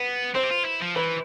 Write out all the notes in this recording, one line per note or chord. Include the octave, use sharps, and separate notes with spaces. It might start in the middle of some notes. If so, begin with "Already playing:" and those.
Already playing: B3 B4
C4 C5
G4
F4
E4
F3
E3 B4